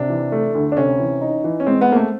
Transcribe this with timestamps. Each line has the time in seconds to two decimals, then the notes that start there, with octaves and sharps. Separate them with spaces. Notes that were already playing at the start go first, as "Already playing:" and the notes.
Already playing: C3 D4
0.09 E3
0.32 A3
0.55 D2
0.72 D4
0.77 C3 C#4
1.00 E3
1.21 D#4
1.44 E3
1.60 C#4
1.67 G#3 C4
1.81 B3
1.89 A#3 C4
1.96 A3